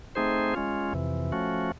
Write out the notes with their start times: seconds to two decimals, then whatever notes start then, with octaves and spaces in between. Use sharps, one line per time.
0.15 A3 C4 D#4 G#4 C5
0.54 G#3 C#4 F4
0.93 F2 C3 E3
1.32 F3 A3 C#4 F#4